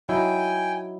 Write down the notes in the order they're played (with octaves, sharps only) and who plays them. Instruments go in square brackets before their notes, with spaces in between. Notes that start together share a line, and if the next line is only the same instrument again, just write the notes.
[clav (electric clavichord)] F#3 D#4 E4 [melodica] G5 G#5